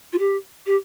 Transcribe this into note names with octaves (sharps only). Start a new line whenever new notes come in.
F4
G4
G4